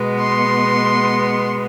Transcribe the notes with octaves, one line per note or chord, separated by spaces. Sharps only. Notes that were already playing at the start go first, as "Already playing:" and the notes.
Already playing: B2 G#3 B3
C6